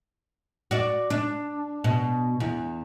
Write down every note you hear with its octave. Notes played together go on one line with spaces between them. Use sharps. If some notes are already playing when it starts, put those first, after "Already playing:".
F#4 D5
D4
B2
E2